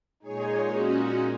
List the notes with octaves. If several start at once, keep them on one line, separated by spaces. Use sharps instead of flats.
A#2 G#3 D#4 G#4 C#5
C#4 F#4